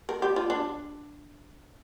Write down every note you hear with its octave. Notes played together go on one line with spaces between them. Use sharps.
A#4
G4
F4
D4